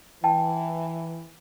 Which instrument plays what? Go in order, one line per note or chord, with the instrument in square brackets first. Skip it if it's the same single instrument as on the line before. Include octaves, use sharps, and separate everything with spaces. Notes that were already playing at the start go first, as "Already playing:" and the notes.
[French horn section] E3 [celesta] G5 A5